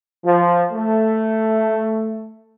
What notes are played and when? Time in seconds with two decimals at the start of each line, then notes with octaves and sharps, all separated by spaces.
0.24 F3
0.71 A3